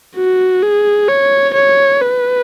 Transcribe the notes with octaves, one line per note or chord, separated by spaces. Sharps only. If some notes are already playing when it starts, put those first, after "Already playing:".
F#4
G#4
C#5
C#5
B4